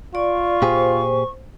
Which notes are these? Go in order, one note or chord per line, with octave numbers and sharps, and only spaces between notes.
F4 D5 C#6
A#2 G4 G#4 C5